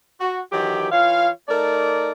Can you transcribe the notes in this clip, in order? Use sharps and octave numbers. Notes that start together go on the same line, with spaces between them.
F#4
D#3 E3 F#3 G4
E3 F4 C#5 F5
A3 D#4 A#4 D5